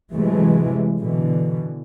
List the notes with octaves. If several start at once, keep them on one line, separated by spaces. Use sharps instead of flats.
C3 E3 F#3 G#3 A3
B2 D3 E3